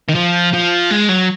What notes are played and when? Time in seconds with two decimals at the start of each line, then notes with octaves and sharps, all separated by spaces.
0.09 D#3
0.15 F3
0.53 F3
0.91 G#3
1.09 F#3